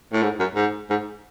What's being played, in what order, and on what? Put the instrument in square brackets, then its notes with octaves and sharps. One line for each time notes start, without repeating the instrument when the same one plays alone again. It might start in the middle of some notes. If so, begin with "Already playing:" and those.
[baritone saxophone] A2
G#2
F#2
G#2
G#2